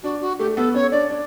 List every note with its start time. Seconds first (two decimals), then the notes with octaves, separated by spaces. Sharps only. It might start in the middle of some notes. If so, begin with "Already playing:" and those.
0.03 D4 F#4
0.21 F#4
0.39 A3 G4
0.52 G4
0.57 B3 A4
0.74 C#4 C#5
0.91 D4 D5
1.10 D4